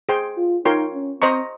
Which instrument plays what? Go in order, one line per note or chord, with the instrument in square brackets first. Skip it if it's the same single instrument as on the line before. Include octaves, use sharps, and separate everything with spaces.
[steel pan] G#4 C5 G5 C6
[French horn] F4
[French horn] D#4 [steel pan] F4 A#4 C#5 G5 C6
[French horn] C#4
[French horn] C4 [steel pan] C5 D#5 A#5 C#6